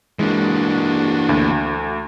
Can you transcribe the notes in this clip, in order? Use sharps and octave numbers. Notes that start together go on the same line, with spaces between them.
E3 G#3 A#3 D4 F#4
D2